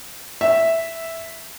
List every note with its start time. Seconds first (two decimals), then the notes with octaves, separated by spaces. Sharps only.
0.41 E5